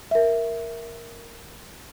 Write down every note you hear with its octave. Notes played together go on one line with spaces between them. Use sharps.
A#4 E5